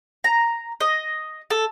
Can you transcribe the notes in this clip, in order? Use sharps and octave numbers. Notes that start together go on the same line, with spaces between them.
A#5
D#5
A4